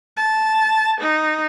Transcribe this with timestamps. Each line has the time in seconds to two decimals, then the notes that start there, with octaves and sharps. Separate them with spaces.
0.17 A5
1.01 D#4